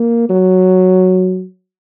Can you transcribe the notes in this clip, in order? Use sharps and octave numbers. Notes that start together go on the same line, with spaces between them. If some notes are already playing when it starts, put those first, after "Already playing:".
Already playing: A#3
F#3